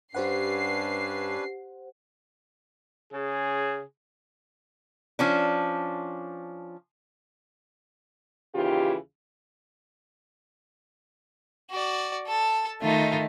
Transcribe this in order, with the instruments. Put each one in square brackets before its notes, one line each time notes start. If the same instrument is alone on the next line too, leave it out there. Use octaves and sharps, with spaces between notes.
[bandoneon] G2 [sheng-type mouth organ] C#4 D4 B4 [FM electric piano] G4 C5 F#5 [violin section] C7
[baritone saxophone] C#3 [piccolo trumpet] G#4
[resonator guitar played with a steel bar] F3 C#4 D4
[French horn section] D#2 C#3 E3 F4 G4
[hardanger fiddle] F#4 D5
A4 A5
[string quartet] D#3 A3 [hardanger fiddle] D#4 F4